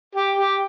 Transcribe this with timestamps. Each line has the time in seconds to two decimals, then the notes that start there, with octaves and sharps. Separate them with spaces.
0.15 G4
0.39 G4